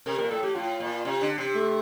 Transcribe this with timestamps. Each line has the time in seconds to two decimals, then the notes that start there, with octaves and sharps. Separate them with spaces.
0.06 C3 A#4
0.18 A#2 A#4
0.31 A2 A4
0.43 A2 G4
0.55 A2 F4
0.80 A#2
1.05 C3
1.21 D3
1.38 C3
1.55 A3